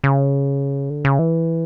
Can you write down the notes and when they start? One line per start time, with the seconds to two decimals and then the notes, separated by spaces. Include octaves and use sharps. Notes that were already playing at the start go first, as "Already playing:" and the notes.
0.04 C#3
0.90 D3
1.05 C#3
1.19 E3